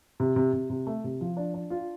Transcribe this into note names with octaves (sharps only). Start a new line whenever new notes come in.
C3
C3
C3
C3
A3
C3
F3
D4
D4
F4